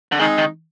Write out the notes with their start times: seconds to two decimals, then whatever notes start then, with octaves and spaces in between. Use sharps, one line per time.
0.12 D3
0.19 D#3 G#3 C4 D#4 G#4
0.38 D#3